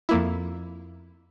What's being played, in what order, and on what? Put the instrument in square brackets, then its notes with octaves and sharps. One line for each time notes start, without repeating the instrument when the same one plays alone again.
[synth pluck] F2 A#3 E4